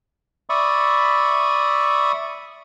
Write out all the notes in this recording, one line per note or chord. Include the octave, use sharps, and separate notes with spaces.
D5 E5 B5 C#6 D#6